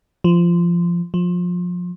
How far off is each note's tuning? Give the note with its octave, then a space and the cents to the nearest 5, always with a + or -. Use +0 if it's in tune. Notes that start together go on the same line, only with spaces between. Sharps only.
F3 -15
F3 +25